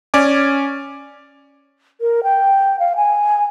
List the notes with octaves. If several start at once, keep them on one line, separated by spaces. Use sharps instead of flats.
C#4 D5 G#5 D6
A#4
G5
F5
G#5